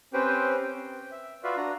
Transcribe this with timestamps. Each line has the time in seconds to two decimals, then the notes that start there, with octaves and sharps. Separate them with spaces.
0.13 C4 C#4 G4 B4 C5 G5
0.63 G5
1.11 E5
1.44 F4 F#4 B4 D5 E5 F5
1.57 D4 F#4 A#5